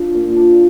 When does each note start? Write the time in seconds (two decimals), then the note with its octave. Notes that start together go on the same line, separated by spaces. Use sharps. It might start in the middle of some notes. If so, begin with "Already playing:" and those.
Already playing: D4 F4
0.15 A#2
0.36 D4